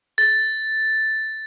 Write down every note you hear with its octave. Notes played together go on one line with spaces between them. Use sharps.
A6